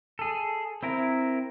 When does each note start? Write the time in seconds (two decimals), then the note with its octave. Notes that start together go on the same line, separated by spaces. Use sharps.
0.19 G#4 A4
0.83 C4 E4 A#4